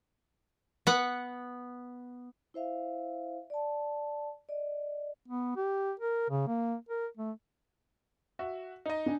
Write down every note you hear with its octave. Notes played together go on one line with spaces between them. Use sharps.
B3 F#5
E4 C5 E5 F5
D5 A5
D5 D#5
B3
G4
A#4
C#3
A#3
A#4
A3
F#4 E5
D#4 D#5
D4 G#5